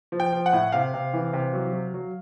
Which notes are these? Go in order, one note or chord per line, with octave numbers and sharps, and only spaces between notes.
F3
G5
F3
F#5
A2
C3 F5
C3
E3
C3
F#3
F#3
F#3